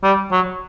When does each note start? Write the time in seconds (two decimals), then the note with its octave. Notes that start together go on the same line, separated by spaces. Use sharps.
0.04 G3
0.32 F#3